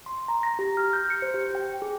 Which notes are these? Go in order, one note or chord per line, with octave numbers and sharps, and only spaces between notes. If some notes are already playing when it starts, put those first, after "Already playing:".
C6
A#5
A#6
G4
F6
G6
C#7
C5
G4
G5
G#4